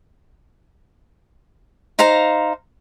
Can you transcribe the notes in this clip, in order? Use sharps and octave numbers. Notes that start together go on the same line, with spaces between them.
D#4 C5 F5 A#5